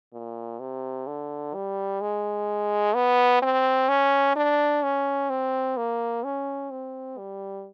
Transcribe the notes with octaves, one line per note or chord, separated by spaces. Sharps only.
A#2
C3
D3
G3
G#3
B3
C4
C#4
D4
C#4
C4
A#3
C#4
C4
G3